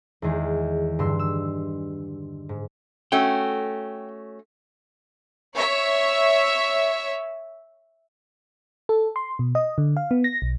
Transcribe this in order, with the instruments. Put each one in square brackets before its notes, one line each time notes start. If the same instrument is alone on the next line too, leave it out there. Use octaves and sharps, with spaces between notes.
[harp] E2 D#3 G#3
G2 D3 C6 E6
E6
G#2
[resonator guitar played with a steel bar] A3 C#4 F#4 [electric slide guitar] G5
[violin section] C#5 E5
[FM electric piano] A4
C6
B2
D#5
D3
F5
B3
A#6
B1